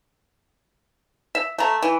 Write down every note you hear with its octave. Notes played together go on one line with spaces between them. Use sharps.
E5
A3 A#5
E3